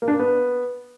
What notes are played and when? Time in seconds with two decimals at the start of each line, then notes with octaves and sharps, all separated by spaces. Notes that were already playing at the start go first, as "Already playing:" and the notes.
0.02 A#3
0.08 D4
0.14 A#3
0.19 B3